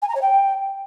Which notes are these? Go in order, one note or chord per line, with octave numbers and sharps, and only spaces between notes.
G#5
A#5
C#5
G5